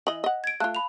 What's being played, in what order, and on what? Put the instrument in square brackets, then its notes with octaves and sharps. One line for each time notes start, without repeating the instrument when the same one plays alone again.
[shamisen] E3 D#5 [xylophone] F#7
[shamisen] D#5 F#5
[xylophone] G#6 D7
[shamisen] A3 F4 [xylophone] F5 A5 F#6
[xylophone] B5 F7